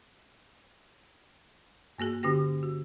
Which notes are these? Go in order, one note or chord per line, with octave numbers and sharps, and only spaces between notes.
G2 A#3 F#4 G#4
D3 C#4 F#4 G4 G5 A#6
F#4